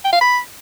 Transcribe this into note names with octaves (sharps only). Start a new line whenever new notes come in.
G5
F5
B5